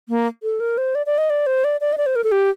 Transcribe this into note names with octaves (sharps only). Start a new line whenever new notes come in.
A#3
A4
A#4
C5
D5
D5
D#5
D5
C5
D5
D5
D#5
D5
C5
A#4
A4
G4